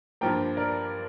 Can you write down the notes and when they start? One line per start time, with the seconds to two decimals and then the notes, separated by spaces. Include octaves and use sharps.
0.21 G2 F3 A#3 G5 A#5
0.57 A#4 D5